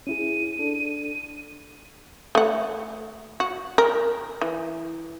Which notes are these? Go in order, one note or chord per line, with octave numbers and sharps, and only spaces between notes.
C#4 E4 G#4 D#7
D4 A4
A3 F#5
F#4
A#4
E3